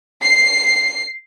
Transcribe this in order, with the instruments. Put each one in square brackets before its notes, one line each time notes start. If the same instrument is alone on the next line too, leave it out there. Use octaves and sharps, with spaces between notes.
[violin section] C7